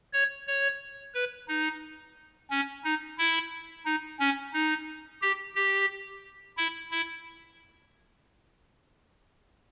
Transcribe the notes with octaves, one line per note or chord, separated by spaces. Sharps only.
C#5
C#5
B4
D#4
C#4
D#4
E4
D#4
C#4
D#4
G4
G4
E4
E4